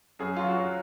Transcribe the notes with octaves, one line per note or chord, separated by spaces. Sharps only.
F#2 G#4
F#3 F4
F#4
F#3